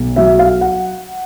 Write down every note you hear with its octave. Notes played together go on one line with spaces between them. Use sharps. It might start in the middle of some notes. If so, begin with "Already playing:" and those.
Already playing: B1
F#3 E5
F5
F#5